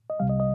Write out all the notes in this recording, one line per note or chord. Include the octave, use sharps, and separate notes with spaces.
D#5
C2 C3 G3 F5
D#5
D#5